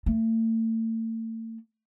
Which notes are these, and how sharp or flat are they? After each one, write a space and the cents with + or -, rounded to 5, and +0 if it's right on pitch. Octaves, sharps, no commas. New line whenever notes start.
A3 +40